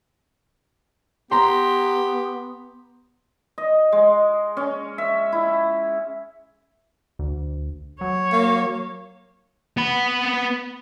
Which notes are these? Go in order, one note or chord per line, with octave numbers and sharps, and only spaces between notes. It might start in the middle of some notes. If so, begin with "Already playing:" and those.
B3 G4 A#5 C6
D#5
G#3
C#4
E5
E4
D2
F#3 C#5
A#3
B3 B5